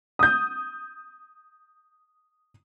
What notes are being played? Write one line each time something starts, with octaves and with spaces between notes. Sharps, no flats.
D#6 G6